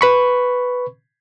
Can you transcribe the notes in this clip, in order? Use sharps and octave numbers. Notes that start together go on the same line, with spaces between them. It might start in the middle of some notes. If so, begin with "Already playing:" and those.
B4 B5 C#6